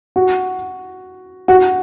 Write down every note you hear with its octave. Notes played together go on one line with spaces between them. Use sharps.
F#4
F#4